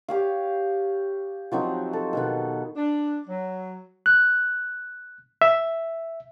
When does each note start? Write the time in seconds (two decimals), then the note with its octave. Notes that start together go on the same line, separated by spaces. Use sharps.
0.08 G4 C#5 F5
1.52 F3 F#3 C4 D#4
1.93 A4
2.13 B2 D#3 B3
2.76 D4
3.27 F#3
4.06 F#6
5.42 E5